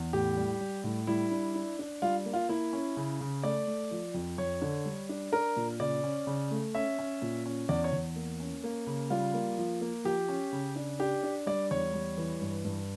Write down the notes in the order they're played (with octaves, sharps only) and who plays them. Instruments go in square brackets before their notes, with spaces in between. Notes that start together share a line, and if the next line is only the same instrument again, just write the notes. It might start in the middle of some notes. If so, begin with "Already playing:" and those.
Already playing: [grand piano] E2
A2 G4
G3
G3
A2
G3 E4
D4
D4
D4
G3 F4
A#3
F4
A#3 E4
C#4
C#3
C#3
A3 D5
A3
F3
F2
F2 C#5
D3
G3
D4
D4 A#4
A#2
C#3 D5
C#4
C#3
A3
C#4 E5
C#4
A#2
C#4
E2 D5
C#5
E2
A#3
C#4
A#3
C#3
G3 F4
A#3
F3
A#3
F3 G4
C#4
C#3
D4
D4 G4
D4
G3 D5
E2 C#5
G3
E3
G2
G2